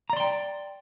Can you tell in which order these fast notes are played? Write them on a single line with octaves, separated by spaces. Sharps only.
A#5 D5 C6 G5